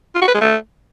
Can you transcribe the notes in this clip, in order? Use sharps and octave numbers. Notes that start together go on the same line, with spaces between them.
F4
F#4
B4
G#3
A3